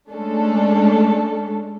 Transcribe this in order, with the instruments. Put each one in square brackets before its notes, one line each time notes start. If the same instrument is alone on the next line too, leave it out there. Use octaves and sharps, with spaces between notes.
[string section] G#3 A3 C#4 D4 A4